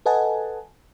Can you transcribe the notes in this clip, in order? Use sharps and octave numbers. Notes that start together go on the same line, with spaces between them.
A4 B4 D#5 F#5 G#5 A5